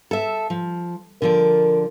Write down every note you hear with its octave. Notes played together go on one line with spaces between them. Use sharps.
A4 E5
F3
D3 F3 A#4 D5